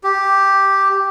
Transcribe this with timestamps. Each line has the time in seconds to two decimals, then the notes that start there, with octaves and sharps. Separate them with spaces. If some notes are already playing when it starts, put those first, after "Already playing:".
0.04 G4